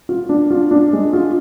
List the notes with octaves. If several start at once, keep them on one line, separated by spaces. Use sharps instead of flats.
F4
D4
F4
D4
G#3
F4